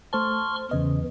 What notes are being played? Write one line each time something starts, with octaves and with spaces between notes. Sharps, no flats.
A3 C5 A5 C6 C#6 F6
E2 C#3 E3 D#5